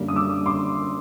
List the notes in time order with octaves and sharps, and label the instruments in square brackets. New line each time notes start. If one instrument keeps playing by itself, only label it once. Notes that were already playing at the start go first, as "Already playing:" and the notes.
Already playing: [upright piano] F#2 D3 G3 A#3
D#6
D6 E6
C6 D6